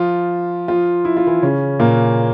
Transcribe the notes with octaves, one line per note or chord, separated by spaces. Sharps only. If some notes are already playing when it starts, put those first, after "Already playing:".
Already playing: F3 F4
F3 F4
E4
F4
E3 E4
C#3 C#4
A#2 A#3